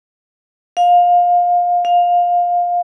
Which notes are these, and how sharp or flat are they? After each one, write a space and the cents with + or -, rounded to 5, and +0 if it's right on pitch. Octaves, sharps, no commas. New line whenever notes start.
F5 +20
F5 +15